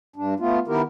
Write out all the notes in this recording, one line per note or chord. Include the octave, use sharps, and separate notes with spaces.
G2 D4
A3 B3 F4
D#3 B3 E4 G4 A#4